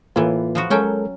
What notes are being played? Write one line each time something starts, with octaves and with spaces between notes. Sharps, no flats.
A2 E3 A#3 F4 B4
F3 B3 F#4
F#3 G#3 C#4 A4 A#4 G5